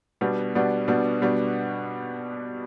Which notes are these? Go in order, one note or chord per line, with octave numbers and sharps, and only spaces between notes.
B2 G3 B3 D4 F#4
B2 G3 B3 D4 F#4
B2 G3 B3 D4 F#4
B2 G3 B3 D4 F#4